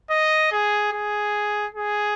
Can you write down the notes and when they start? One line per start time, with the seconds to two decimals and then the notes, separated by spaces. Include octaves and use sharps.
0.10 D#5
0.52 G#4
0.92 G#4
1.75 G#4